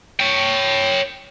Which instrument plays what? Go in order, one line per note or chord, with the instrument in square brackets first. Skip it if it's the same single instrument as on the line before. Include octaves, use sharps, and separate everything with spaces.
[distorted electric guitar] C#5 G5